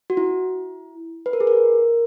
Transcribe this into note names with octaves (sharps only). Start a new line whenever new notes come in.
F#4
E4
B4
A#4
G#4
A#4